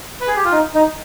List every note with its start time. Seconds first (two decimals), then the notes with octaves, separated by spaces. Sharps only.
0.21 B4
0.28 G#4
0.36 G4
0.44 F4
0.52 D#4
0.75 D#4